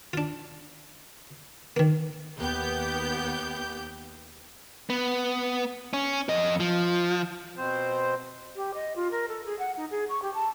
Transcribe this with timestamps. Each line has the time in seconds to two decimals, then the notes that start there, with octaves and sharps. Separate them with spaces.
0.13 D4 F4
1.76 D#3 A#3
2.39 D#2 B3 G4 G6
4.90 B3
5.93 C#4
6.29 F2 D#5
6.60 F3
7.55 B2 C4 C5
8.55 G4
8.74 D#5
8.96 F4
9.11 A#4
9.28 A4
9.46 G#4
9.59 F#5
9.77 D#4
9.91 G#4
10.09 C#6
10.22 G4
10.34 A5